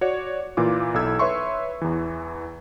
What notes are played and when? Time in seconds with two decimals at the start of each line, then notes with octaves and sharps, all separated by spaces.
0.01 F#4 C#5 D5
0.57 A#2 E3 F4 D6
0.94 B1 E4 A4 E6 G#6
1.19 B4 C#5 E5 C6 C#6
1.82 E2 E3